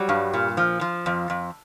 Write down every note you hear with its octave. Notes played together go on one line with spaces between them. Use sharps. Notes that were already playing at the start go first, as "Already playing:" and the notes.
Already playing: F#3 G3
G2
A#2
F3
F3
F2
F2